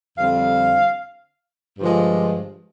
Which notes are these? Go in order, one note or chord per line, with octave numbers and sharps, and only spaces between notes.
F2 D3 G3 C4 F5
G2 D3 F3 G#3